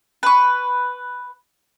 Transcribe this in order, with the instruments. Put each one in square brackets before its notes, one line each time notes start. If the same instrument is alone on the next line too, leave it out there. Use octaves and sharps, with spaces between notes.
[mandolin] B4 C#6